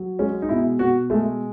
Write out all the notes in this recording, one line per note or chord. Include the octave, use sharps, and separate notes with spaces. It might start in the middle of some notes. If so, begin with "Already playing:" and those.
Already playing: F#3
G#3 C#4
D#4
B2 E4
B2 F#4
G#3 A3